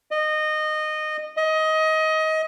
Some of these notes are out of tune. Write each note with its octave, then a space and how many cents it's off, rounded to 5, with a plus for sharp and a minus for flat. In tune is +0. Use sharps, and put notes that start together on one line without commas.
D#5 -20
D#5 +20